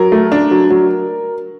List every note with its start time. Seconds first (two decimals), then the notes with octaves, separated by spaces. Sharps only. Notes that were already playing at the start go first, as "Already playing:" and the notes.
Already playing: F#3 A#4
0.12 A3
0.32 D4
0.51 F#3
0.70 F#3